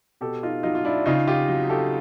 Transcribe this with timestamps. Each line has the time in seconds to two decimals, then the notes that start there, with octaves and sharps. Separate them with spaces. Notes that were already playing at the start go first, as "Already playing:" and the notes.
0.21 B2 G4 A4
0.43 D#4 F4
0.63 F#3 D#4 F4
0.75 F4
0.85 D4 E4
1.06 C#3 D#4 F4
1.28 F4 G4
1.49 F#3
1.69 G4 A4